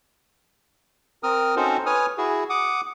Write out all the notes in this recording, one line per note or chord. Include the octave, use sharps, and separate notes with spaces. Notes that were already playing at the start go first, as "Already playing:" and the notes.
C4 A#4 D#6 F6
C4 C#4 D#4 F#4 A4 C5
B4 C#5 G#5 D#6 F6
E4 F#4 G#4
F#5 D6 D#6